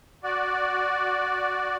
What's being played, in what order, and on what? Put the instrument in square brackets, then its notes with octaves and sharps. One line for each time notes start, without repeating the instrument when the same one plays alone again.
[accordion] F#4 D5